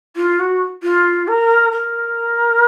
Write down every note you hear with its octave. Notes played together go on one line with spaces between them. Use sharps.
F4
F#4
F4
A#4
A#4